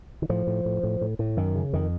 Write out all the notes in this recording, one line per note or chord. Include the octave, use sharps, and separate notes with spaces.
D#3
A2 F3
A2
A2
A2
A2
A2
F#2 D#3
C#3
F2 D#3